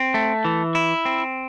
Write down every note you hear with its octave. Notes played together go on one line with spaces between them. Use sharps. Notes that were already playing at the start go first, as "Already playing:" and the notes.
Already playing: C4
A3
E3
E4
C4